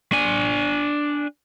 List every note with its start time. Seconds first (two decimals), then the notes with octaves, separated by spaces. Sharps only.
0.13 D4 G#5